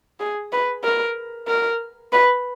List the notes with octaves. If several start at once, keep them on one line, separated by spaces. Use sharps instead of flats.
G#4
B4
A#4
A#4
B4